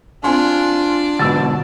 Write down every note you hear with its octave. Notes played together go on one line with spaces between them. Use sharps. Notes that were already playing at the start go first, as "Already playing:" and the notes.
C4 D4 F4 G#5 C6
G#2 B2 D3 A5 E6 A6